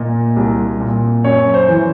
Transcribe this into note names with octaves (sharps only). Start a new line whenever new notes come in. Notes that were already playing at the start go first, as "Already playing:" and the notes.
Already playing: A#2 D#5
C2
A#2
F#2 C#5
C5
E3